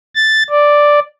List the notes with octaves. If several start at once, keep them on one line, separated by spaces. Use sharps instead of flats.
A6
D5